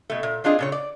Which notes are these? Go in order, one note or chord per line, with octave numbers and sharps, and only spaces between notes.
B2 A3
A#2
C4 D4 F4 G#4 D#5
A#2 C#3 C#5
D5